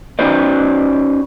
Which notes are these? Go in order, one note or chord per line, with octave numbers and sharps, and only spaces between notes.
C#4 D#4 F#4 B4 C5 D5